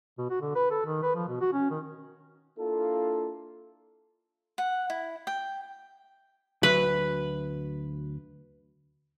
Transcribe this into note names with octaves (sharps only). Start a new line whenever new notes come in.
B2
F#4
D3
B4
A4
D#3
B4
F3
B2
F#4
C#4
D#3
A#3 D4 E4 F4 A4
F#5
E4
G5
D2 F#3 B4